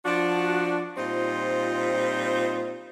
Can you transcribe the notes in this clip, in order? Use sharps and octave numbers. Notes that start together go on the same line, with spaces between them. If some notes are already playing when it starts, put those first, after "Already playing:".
F3 D4 F#4
A#2 G3 C4 D#4 F4 C5